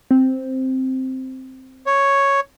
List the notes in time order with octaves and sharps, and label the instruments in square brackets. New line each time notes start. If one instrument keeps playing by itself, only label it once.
[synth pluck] C4
[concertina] C#5